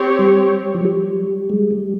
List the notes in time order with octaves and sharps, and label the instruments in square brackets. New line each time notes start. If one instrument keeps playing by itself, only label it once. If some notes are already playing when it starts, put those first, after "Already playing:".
Already playing: [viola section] C4 G4 C#5
[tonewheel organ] G3
F3
G3
G#3
G3